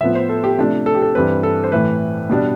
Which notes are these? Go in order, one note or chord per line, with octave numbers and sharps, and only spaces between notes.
A2 F3 B3 E5
C5
A4
G4
C3 F3 A3 D4
A4
G4
A4
G2 E3 G3 C4 B4
A4
C5
A2 E3 A3 B4
B2 G3 D4